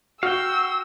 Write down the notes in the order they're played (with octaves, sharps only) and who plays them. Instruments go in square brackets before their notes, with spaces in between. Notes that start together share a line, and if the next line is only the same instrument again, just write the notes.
[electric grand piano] F#4 [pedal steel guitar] F5 G5 [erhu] E6